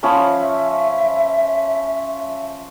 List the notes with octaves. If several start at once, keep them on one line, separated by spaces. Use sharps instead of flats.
F3 C#4 E5 B5